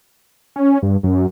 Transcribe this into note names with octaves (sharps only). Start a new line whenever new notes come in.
C#4
G2
F#2